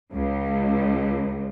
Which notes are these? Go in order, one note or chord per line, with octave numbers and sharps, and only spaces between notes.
C#2